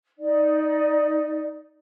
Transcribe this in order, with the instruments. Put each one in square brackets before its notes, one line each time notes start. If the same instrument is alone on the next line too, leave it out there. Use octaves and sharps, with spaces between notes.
[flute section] D#4 D5